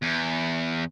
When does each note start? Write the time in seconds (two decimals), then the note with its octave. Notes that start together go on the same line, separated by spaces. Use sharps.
0.02 E2